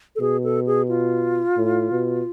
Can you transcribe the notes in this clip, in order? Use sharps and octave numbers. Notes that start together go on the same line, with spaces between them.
A4
B2 G#4
A4
G#4
F4
A2
B2